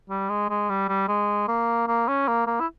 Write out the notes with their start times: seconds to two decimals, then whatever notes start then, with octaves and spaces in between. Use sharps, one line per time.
0.10 G3
0.30 G#3
0.50 G#3
0.70 G3
0.88 G3
1.08 G#3
1.48 A#3
1.88 A#3
2.08 C#4
2.28 A#3
2.47 A#3
2.60 E4